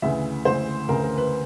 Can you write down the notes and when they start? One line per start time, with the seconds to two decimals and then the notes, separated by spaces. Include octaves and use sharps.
0.02 D2 C#3 E3 E5
0.45 D2 C#3 E3 C5
0.88 D2 C#3 E3 A#4
1.03 A#4
1.17 B4